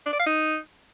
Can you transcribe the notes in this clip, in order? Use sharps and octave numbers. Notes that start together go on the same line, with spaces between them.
D4
D5
F5
D#4